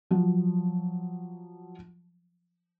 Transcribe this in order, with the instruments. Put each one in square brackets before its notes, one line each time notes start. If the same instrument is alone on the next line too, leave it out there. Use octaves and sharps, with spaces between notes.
[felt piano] F3 F#3